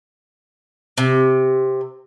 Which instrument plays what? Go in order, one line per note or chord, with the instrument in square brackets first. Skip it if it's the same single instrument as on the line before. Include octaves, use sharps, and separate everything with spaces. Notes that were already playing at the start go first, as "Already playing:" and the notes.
[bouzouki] C3